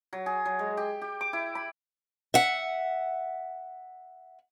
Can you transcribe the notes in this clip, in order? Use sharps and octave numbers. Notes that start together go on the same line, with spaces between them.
F#3
G#4
F#3
G#3
G4
G4
D6
E4
B5
E5 F#5